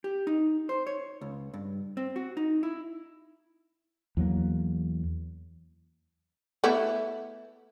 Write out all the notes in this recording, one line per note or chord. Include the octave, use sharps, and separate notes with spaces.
G4
D#4
C5
C#5
C#2
G2
C4
F#4
D#4
E4
E2 F#3 A#3
A3 B3 E4